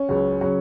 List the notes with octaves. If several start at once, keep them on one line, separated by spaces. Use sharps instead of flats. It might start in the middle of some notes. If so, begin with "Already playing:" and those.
Already playing: C#4
C#2 C#3 F#3
C#3 F#3